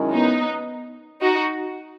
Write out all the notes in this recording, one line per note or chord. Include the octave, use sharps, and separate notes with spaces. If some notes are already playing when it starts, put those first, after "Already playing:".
Already playing: F#2 D#3 G#3 C#4 E4
B3 D#4
D#4 F#4